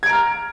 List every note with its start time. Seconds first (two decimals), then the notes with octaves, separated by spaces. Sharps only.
0.03 G#6
0.06 D7
0.09 A#5
0.13 F6